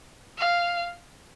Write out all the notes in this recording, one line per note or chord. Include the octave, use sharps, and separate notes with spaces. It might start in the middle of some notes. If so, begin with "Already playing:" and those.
F5